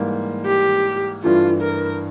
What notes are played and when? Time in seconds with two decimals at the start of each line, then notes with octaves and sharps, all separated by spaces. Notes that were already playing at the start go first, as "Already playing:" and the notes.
Already playing: G#2 E3 G3 A#3
0.46 G4
1.23 G2 E3 A3 F4
1.62 A#4